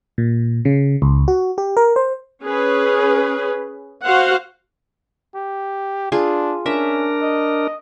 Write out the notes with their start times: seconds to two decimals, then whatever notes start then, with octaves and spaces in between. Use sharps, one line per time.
0.18 A#2
0.65 C#3
1.02 C#2
1.28 F#4
1.58 G4
1.77 A#4
1.96 C5
2.44 C#4 G#4 B4
4.06 F#4 C5 F5 F#5
5.35 G4
6.12 D4 F4 G#4
6.66 C#4 D4 A#4 E5
7.22 D#5